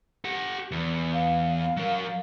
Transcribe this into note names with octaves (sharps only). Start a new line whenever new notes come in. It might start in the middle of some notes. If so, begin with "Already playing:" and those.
G4 F#5
E2
F5
F#3 A#4